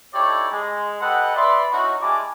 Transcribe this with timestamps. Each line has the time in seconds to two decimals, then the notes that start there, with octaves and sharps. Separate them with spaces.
0.14 D#4 E4 G4 A4 C#5 D5
0.51 G#3
1.01 G4 A4 B4 D#5 F#5
1.36 B4 D5 E5 B5 C6
1.72 C#4 D#4 E4 F#4
2.02 G3 G#3 E4 G#5 A5 D6